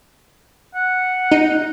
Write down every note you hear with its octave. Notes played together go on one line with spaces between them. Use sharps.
F#5
D#4